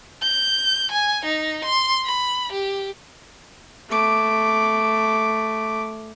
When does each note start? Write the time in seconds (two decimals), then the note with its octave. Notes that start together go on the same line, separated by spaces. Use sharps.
0.23 G6
0.91 G#5
1.25 D#4
1.65 C6
2.06 B5
2.52 G4
3.90 A3 D6